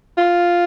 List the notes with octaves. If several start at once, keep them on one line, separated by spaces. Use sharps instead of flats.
F4